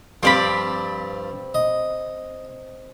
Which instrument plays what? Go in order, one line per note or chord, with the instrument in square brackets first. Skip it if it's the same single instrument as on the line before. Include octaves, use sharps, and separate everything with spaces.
[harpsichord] G2 F3 [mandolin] C4 D5 B5
[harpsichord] D#5